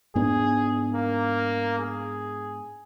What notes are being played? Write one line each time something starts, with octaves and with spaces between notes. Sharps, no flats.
G#2 B3 D4 G#4
A#3
G#4